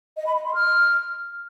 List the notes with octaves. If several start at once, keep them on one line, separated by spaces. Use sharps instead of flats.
D#5
B5
D#5
C6
F6